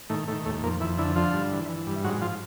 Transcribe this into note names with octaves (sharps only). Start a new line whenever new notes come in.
A2 D#3 A3
A2 D#3 A3
D#2 A2 A3
F2 A#2 A#3
F2 E3 E4
D3 E3 E4
D3 F3 F4
G2
E3
E3
G2
G#2 F#3 F#4
F3 F4